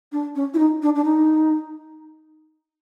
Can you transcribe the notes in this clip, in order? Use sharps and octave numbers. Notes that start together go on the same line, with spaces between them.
D4
C#4
E4
D#4
D4
D4
D#4